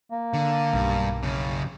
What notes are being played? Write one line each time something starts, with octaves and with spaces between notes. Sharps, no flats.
A#3
D3
B1 G2
F#2 C#3